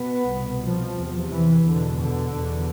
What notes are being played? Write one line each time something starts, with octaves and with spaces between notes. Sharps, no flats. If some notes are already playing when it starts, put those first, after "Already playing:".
Already playing: B2 B3
C2 B2
F3
E2 C3
E3
E2 B2 D3
D3
E2 B2